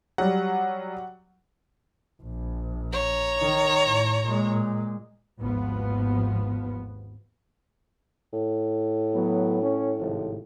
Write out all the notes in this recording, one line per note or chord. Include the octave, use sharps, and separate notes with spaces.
F#3 G3 F#5
A#1
C#5 A#5
D#3
A2
A#2 G#3
G#1 D#2 F3 B3
A2
F#3 B3
C#4
G#1 C3 F3